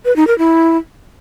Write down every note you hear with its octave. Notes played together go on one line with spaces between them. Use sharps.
B4
D#4
A#4
E4